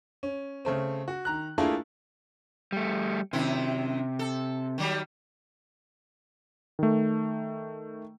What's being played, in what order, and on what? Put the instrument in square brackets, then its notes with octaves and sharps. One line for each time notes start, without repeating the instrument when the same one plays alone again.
[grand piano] C#4
C#3 A3 C4
F#4
D#3 A#5 F#6
A3 A#3 D4 E4 F4 G#4
[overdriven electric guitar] G3 A3
[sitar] F#2 D#3 E4 [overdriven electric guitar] C3
[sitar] A4
D#3 F#3 G3
[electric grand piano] D#3 A3